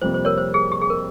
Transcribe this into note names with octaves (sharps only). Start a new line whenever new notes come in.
F2 C3 G3 A#3 C5
C5
A#4 C#5
C5
G#4
G4
G#4
A#4